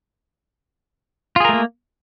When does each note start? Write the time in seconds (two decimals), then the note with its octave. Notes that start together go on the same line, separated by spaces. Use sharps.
1.36 F4
1.40 G#4
1.45 A#4
1.49 A3
1.53 A#3